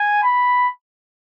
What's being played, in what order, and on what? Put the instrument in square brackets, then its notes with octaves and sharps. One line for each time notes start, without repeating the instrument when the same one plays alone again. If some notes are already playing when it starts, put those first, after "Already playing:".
Already playing: [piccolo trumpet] G#5
B5